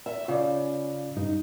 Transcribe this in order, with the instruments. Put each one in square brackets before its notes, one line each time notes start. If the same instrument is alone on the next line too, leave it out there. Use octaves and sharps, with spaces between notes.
[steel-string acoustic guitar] E5
[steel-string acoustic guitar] C#3 [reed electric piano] F4 D5
[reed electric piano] G2 D#4